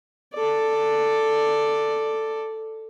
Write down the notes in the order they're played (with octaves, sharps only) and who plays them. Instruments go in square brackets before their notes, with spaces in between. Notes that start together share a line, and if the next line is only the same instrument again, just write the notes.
[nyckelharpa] A4 D5